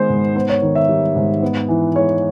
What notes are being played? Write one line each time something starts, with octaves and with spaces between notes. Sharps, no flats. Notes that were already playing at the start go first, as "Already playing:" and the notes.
Already playing: D#3 G#3 B3 C5
G#2
B3 C5
C#5
D#3
E5
G3
G#2
B3
E3
G#3 C#5